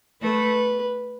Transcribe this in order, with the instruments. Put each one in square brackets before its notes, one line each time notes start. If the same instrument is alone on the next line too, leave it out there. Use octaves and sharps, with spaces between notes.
[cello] A3 [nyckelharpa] B4